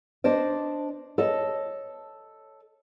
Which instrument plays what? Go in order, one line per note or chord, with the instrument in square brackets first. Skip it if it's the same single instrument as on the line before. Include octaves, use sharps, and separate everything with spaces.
[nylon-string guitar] D4 C5 D5 D#5
A4 C#5 D#5 A5